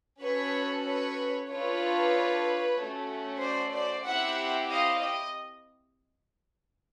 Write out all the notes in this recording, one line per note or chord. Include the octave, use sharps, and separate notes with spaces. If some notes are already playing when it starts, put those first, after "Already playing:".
C#4 F#4 A4 B4 C#5
B4 C#5
D4 F4 A4 B4 C#5
A3 C#4 F#4
C5 D5
C5 D5
C4 E4 G4 E5 F#5
D#5 F5
D#5